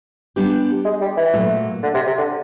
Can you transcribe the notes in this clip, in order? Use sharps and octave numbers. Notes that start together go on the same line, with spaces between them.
G3 B3 D4 G4 B4
G#3
G3
E3
A#2 F#3 A3
D3
C3
C3
D3